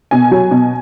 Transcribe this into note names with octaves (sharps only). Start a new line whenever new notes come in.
B2 G#5
F#3
B2